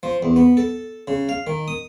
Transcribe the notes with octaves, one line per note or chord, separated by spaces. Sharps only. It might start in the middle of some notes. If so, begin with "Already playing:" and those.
F3
E2
B3
A4
C#3
F5
D#3
D#6